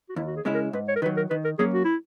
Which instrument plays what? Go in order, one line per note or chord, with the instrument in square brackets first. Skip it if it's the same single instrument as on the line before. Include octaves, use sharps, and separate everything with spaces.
[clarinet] F#4
[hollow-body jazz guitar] D#2 [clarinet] E4
[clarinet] F#4
G#4
[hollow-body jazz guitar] C#3 G#3 C#4 E4
[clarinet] A#4
[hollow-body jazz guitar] G#2 [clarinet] B4
[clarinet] C#5
A#4
[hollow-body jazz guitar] D#3 [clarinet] B4
[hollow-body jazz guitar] F#3
[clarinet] A#4
[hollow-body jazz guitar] D#3 [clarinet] B4
[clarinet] A#4
[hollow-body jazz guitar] F#3 A#3 C#4 [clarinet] G#4
[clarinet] F#4
E4